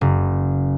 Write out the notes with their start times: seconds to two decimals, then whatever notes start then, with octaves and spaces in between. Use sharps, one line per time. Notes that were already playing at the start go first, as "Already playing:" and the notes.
0.01 F#1